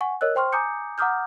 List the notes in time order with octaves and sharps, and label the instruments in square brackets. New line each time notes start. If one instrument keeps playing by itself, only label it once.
[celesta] F#5 G#5 C#6
A#4 C#5 D#5 E6 F#6
C5 G5 C6 C#6 F6
G#5 A#5 D6 D#6 G6 C#7
F#5 A#5 D6 D#6 F6 G6